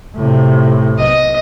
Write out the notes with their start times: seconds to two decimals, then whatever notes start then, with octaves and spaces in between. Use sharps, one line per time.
0.15 A2 C3
0.99 B1 D#5